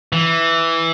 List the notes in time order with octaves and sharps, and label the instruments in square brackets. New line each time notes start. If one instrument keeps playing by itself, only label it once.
[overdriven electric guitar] E3